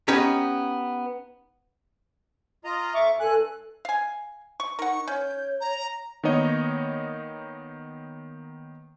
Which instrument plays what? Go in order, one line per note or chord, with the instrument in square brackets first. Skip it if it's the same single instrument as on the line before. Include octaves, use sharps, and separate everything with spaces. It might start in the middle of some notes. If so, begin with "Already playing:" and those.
[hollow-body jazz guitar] B3 C#4 D#4 G4
[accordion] F4 D#5 A#5
[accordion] F2 C#6 D6 [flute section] E5
[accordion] G2 F#6 [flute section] A4 G#5
[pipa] F5 G#5
C#6
[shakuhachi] D#4 [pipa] A#4 F#5 [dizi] C#6
[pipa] C#4 [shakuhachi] C#5 [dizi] G6
[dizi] A#5
[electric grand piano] D#3 A#3 B3 D#4 C#5 D#5